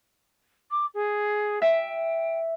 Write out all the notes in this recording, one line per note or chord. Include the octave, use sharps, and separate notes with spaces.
D6
G#4
E5 G5